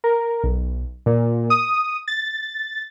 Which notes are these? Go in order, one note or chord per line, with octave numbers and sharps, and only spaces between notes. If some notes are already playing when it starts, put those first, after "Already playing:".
A#4
B1
A#2
D#6
A6